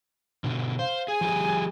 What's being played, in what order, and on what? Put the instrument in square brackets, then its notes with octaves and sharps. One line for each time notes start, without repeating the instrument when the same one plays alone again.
[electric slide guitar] B2 D3
[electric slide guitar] C5 [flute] F5
[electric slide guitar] G#4 [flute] G#5
[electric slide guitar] F3 G4 G#4